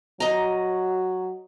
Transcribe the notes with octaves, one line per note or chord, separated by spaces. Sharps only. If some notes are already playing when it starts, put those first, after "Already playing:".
F#3 D#5 A#5